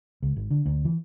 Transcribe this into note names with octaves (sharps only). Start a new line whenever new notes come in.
C#2
G#1
D3
D2
E3